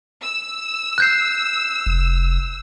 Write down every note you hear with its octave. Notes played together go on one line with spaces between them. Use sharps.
E6
F#6 G6 C7
F1